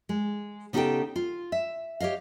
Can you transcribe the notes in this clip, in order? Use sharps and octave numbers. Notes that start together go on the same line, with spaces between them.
G#3
C#3 B3 D#4 G4 A4 G5
F4
E5
G4 C#5 D#5 F5